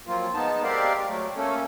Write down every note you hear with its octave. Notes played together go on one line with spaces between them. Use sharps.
F3 F#3 A#3 C4 F4
G#3 B3 D#4 A5
G#3 C4 G4 A#4 D5 F5
F#3 A3
A3 A#3 C#4 A4